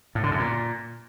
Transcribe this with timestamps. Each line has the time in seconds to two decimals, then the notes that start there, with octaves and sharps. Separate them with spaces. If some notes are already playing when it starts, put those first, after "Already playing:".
0.15 A2
0.23 D3
0.31 F#2
0.39 A#2